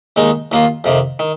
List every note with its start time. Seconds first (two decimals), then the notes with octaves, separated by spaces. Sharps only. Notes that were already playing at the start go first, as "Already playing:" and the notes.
0.16 D#2 D#3 G#3 D#4
0.52 D#2 D#3 A#3 F4
0.84 F2 C3 D#3
1.19 D#3